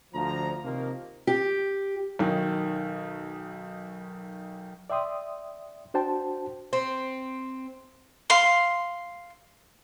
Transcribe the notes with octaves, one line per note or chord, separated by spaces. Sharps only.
D2 F3 A#5
C3 D#3 F3 A#3
G4
B1 D#3
D5 E5 G5 C6 D#6
D4 F#4 C5 G5 A5
C4
F5 C6